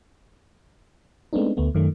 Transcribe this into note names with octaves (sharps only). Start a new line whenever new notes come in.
G#3 A3 B3 C4 D4 D#4
D2 A3 B3
F#2 D#3 A3